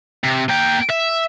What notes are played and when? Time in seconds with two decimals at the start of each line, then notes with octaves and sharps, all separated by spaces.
0.24 C3
0.49 A#3 G5
0.89 E5